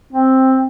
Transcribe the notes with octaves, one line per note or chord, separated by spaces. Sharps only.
C4